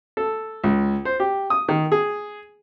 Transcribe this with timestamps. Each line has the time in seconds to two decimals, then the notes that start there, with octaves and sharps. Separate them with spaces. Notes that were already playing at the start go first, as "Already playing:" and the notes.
0.17 A4
0.64 C#2
1.05 C5
1.20 G4
1.50 D#6
1.69 D#3
1.92 G#4